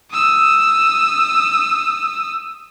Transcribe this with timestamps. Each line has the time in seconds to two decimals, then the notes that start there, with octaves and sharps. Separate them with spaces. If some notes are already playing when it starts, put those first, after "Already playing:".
0.11 D#6 E6